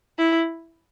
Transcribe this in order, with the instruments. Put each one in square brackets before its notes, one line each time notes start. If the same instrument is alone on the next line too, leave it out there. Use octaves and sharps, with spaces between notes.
[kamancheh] E4